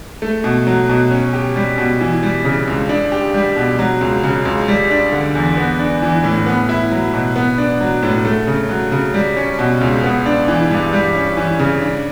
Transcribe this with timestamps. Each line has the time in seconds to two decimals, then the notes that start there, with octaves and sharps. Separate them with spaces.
0.22 A3
0.44 B2
0.67 F#3
0.89 B2
1.11 C#4
1.33 G4
1.56 G3
1.78 B2
2.00 E3
2.23 G3
2.45 C#3
2.67 C#2
2.89 D4
3.12 G4
3.34 G3
3.56 B2
3.79 F#3
4.01 C#2
4.23 C#3
4.45 C#2
4.68 G3
4.90 D4
5.12 D3
5.35 E2
5.57 B3
5.79 D4
6.02 E3
6.24 A2
6.46 B3
6.69 E4
6.92 F#3
7.13 B2
7.36 B3
7.58 D4
7.81 F#3
8.03 A2
8.25 A3
8.47 C#3
8.69 F#3
8.92 C#3
9.14 G3
9.36 C#4
9.59 B2
9.81 C#2
10.04 B3
10.26 D4
10.48 E3
10.70 G2
10.93 G3
11.15 C#4
11.37 E3
11.59 C#3
11.82 D4